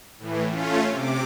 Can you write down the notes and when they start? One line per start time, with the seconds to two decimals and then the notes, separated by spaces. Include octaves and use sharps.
0.19 A2 E3
0.50 A3 C#4 F4
0.90 C3 D6